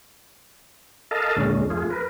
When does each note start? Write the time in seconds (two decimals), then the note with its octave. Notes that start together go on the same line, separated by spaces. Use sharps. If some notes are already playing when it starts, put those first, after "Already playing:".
1.11 A4 A#4 D#5 F5 A5
1.36 D#2 A#2 D3 G#3 C#4
1.70 F2 A3 F4 G#4
1.91 A#4 B4